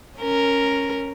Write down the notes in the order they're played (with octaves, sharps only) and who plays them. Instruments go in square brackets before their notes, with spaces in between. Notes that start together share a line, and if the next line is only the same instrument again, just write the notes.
[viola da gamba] C#4 A#4